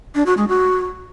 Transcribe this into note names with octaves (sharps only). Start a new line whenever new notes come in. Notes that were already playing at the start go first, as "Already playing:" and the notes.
D4
F#4
G#3
F#4